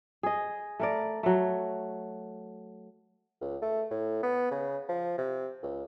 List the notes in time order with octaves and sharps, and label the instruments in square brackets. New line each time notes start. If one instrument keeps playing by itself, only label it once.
[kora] G#4 D#5
A3 A#4 D5
F#3 A3
[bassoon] C#2
A3
A2
B3
C#3
F3
C3
C#2